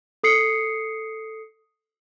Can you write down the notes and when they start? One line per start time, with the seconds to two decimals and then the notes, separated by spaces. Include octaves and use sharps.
0.24 A4 D#6 C7 C#7